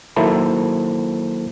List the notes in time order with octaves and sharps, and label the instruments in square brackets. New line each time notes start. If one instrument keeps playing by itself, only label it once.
[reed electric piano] D#3 F#3 A#3 E4 A4 C5